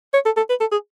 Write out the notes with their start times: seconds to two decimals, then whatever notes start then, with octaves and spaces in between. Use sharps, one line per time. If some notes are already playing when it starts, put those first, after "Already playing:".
0.14 C#5
0.26 A4
0.37 A4
0.49 B4
0.60 A4
0.72 G#4